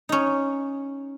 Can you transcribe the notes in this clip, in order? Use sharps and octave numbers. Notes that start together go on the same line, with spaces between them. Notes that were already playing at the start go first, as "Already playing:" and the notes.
C#4 D#4